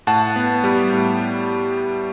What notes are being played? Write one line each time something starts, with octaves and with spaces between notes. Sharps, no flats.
A2 F#5 A5
B3
G3
A2